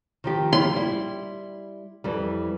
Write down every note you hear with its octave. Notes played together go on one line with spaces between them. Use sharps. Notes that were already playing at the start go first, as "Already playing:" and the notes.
D#3 F3 G4
C6
G3 E4
F2 E3 G3